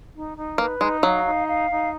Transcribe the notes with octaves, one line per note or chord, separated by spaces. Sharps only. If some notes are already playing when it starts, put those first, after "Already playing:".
D#4
D#4
A#3 B4
G#3 D#4
F#3 F5
D#4
F5
D#4